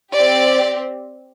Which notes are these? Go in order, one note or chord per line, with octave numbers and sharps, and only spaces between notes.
C4 G4 D5